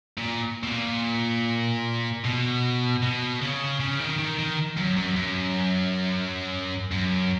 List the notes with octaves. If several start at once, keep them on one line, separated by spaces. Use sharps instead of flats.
A#2
B2
A#2
B2
B2
C#3
C#3
D#3
D#3
D#3
F#2
F#2
F#2
F#2